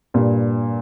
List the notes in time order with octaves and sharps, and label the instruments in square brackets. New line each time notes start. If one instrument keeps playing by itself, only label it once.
[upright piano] G2 A#2